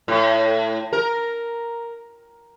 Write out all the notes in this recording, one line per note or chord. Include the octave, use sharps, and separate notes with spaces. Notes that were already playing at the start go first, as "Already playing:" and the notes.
A2
A#4